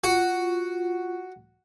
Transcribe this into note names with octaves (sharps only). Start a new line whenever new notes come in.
F4 F#4